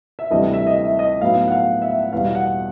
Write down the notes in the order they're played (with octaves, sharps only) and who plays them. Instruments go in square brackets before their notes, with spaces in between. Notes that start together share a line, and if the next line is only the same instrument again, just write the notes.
[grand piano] E5
D2 C3 E3 G3 D#5
E5
D#5
E5
D#5
A2 F#3 B3 D#4 F5
F#5
F5
E5
E2 B2 G3 F5
F#5